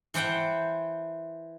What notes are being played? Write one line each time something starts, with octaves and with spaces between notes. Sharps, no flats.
E3 C5 F#5 G5 A5